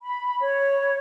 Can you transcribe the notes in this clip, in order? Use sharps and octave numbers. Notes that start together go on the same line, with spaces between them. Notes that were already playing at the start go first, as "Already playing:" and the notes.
B5
C#5